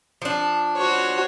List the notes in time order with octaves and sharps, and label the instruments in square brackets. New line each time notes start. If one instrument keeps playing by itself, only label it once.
[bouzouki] F3 D4
[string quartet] F#4 C5 C#5